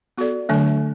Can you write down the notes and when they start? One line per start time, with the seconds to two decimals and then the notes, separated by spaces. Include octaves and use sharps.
0.18 B3 F#4 A4 D5
0.49 D3 F#3 A3 D4